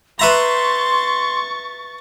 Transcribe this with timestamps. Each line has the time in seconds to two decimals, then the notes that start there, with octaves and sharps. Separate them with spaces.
0.19 B4 E5 A#5 C6 C#6 A6